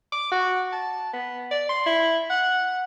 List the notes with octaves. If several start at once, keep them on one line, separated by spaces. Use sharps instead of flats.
D6
F#4
A5
B3
D5
C6
E4
F#5